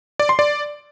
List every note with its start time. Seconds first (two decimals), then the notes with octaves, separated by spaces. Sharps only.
0.20 D5
0.29 C6
0.39 D5